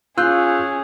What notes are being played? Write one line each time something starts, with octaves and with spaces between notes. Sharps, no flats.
C#4 F4 G#4 E6 F#6 G6